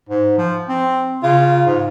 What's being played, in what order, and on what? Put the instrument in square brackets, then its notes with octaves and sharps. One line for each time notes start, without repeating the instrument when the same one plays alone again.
[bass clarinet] G#2
F3
C4
[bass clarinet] C#3 [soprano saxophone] F4
[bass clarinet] G#2